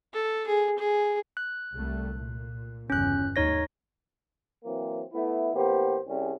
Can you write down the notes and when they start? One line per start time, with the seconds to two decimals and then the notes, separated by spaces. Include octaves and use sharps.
0.14 A4
0.47 G#4
0.78 G#4
1.37 F#6
1.75 C2 G3 A3
2.13 A#2
2.90 G1 E2 C#3 C#4 F#6
3.36 D#2 G#2 D#4 C#5 A#6
4.64 E3 F#3 A#3 C4
5.13 A3 B3 E4
5.54 A1 A#3 B3 G4 C5
6.07 C2 G3 C4 C#4 G#4